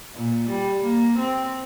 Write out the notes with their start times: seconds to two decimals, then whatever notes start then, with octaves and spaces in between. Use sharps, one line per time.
0.15 A#2
0.49 G3
0.83 A#3
1.18 C4